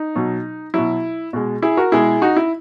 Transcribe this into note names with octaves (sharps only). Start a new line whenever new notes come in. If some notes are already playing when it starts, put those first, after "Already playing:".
Already playing: D#4
B2 F#3
B2 F#3 E4
B2 G#3
E4 G#4
F#4 A#4
B2 G#3 E4 G#4
D#4 F#4
E4